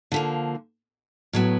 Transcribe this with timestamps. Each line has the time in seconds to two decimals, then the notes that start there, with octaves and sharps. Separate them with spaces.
0.12 D3 F3 A#3
1.33 A2 F#3 B3